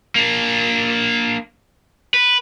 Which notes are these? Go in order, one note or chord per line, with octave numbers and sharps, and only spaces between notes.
A#3 D4
B4